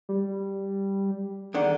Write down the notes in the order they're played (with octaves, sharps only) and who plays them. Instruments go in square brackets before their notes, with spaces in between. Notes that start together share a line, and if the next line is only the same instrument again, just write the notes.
[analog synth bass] G3
[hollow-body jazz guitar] E2 D3 D#3